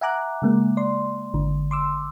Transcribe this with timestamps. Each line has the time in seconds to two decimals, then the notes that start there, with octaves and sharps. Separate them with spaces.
0.01 E5 F#5 G#5 A#5 D6 F#6
0.42 C#3 G#3 A#3
0.77 D5 C6
1.34 G#1 D3
1.71 C6 D6 E6